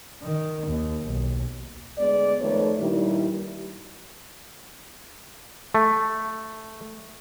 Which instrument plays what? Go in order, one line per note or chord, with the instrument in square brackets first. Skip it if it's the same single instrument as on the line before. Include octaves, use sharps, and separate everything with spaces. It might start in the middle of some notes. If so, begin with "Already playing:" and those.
[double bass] D#3
D#2
B1
[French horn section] D2 G#3 B3 D5
F2 D#3 A3 B4 C#5
G2 A#2 D#3 G3 E4
[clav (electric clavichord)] A3